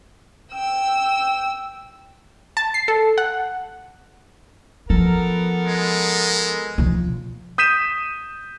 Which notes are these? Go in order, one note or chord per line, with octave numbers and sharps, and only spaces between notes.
G5 E6
A5
C7
A4
F#5
F3 B3 A4 A#4
G#3
B2 F3
D#6 G6 B6 D#7 E7